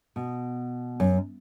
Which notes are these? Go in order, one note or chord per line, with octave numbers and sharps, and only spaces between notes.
B2
F#2